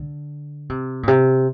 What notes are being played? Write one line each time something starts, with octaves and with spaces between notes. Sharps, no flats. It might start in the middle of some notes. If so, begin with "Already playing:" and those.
Already playing: D3
C3
A#2
C3